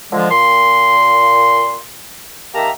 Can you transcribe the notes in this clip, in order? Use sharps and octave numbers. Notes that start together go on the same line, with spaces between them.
D3 F3 G#3
A#2 C6
D#3 A#3 G4 E5 A5 A#5